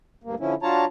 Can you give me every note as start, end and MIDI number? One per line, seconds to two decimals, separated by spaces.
0.24 0.35 38
0.24 0.35 43
0.24 0.35 58
0.40 0.54 50
0.40 0.54 53
0.40 0.54 61
0.40 0.54 64
0.63 0.85 54
0.63 0.85 62
0.63 0.85 65
0.63 0.85 73
0.63 0.85 81
0.63 0.85 82